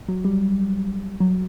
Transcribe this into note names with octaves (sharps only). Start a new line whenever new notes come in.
F#3
G3
F#3